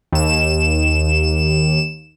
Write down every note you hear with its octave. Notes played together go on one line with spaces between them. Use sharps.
D#2 E7